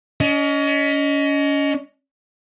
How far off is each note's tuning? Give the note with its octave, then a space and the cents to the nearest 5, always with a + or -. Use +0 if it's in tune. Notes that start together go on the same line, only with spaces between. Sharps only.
C#4 +35 D#5 +0